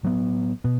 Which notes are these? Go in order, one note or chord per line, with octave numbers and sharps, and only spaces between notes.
A2 F#3 B3
B2 B3